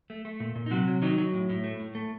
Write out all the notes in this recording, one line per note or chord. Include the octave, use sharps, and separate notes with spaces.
A3
A3
A#2
A#2
D#4
C3 F#3 F#4
F#3
D#3 F#3 D#4
F#3
A2
A2
A3
A2
A3